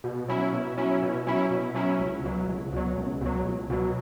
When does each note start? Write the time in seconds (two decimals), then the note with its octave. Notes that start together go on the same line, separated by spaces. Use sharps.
0.04 B2
0.28 F#3 C#4 E4
0.53 B2
0.77 F#3 C#4 E4
1.02 B2
1.27 F#3 C#4 E4
1.50 B2
1.75 F#3 C#4 E4
1.99 C#2
2.24 B2 F#3
2.48 C#2
2.73 B2 F#3
2.97 C#2
3.21 B2 F#3
3.45 C#2
3.70 B2 F#3